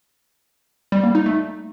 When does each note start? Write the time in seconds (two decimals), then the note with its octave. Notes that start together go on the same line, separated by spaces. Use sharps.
0.92 G3
1.04 A#3
1.15 D#4
1.26 A3